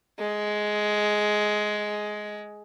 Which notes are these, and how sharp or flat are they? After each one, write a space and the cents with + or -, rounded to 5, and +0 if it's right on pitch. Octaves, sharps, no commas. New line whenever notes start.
G#3 +10